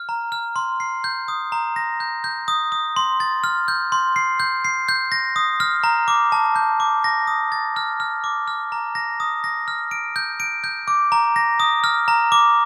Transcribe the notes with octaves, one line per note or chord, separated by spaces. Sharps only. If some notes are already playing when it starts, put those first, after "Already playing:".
Already playing: F6
A#5
F6
C6
C7
G6
D#6
A#5
A#6
G6
G6
D#6
D#6
C6
A6
F6
G6
C6
C7
G6
C7
G6
A#6
D#6
F6
A#5
D6
A5
G6
D6
A#6
D#6
A6
F6
F6
D6
F6
A#5
A#6
D#6
A#6
F6
D7
G6
D7
G6
D6
A#5
A#6
D#6
F6
A#5
D6